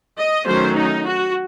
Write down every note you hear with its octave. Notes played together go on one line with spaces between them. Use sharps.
D#5
D#3 F#3 A3 C#4 C5
D#4
F#4